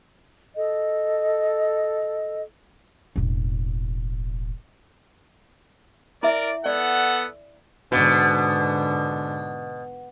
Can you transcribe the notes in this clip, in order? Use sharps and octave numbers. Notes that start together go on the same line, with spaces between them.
A4 D#5
E1 A1
E4 A#4 D5 E5
B3 A4 D5 F#5
G#2 B2 D3